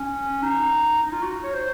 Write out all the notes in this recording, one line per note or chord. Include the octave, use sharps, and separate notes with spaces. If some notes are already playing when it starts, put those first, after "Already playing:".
Already playing: C#4
D#4
D#4
F4
F#4
C#5
C5